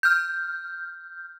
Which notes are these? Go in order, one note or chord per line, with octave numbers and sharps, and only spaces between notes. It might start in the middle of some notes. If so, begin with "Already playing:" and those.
F6 G6